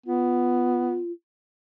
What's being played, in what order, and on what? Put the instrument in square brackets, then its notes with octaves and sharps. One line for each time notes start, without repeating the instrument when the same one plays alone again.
[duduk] B3 [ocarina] F4